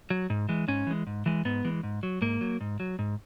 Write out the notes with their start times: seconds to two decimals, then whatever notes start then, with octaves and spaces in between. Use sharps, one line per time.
0.10 F#3
0.30 G#2
0.49 E3 G#3
0.68 G#2 C#4
0.87 E3 G#3
1.07 G#2
1.26 E3 G#3
1.45 G#2 B3
1.65 E3 G#3
1.83 G#2
2.03 F#3
2.21 G#2 A#3
2.41 F#3
2.61 G#2
2.80 F#3
2.99 G#2